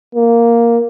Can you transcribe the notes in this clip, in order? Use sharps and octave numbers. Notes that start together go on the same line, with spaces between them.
A#3